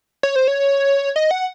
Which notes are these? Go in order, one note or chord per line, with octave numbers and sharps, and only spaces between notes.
C#5
C5
C#5
D#5
F#5